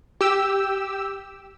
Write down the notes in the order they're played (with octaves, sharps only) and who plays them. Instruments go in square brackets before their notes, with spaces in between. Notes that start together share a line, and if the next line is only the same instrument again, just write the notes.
[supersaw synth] G4 E6